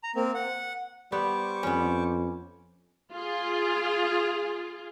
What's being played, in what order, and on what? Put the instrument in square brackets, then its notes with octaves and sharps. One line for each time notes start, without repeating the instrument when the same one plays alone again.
[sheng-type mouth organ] A#5
A#3 C4
F#5
[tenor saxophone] G3 [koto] B3 [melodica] C5 C#6 D6
[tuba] F2 [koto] B3 C#4
[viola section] F4 G#4